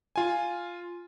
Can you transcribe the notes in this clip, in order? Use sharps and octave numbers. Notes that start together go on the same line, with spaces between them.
F4 G#5